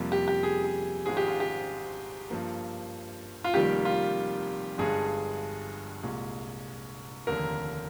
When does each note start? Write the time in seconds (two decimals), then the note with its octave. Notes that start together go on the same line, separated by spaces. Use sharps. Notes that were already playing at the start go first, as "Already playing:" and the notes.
Already playing: F2 C3 G3 A#3
0.12 G4
0.28 G4
0.43 G#4
0.64 G#4
1.05 G#1 G#2 F3 G#3 G#4
1.17 G4
1.28 F4
1.40 G4
2.30 G2 F3 A#3
3.44 F4
3.54 F1 F2 D#3 G3 A#3 G4
3.85 F4
4.78 G1 G2 D3 G#3 G#4
6.03 C2 A#2 G#3
7.27 F1 D#2 D3 A#4